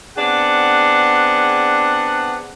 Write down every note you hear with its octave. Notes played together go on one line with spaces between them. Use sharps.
B3 C4 D4 G#4 F#5